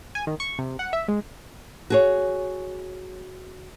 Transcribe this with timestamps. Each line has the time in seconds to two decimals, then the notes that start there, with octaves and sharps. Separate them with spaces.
0.15 G#5
0.27 D#3
0.40 C#6
0.59 C3
0.79 F#5
0.93 E5
1.08 G#3
1.90 F#4 G#4 C#5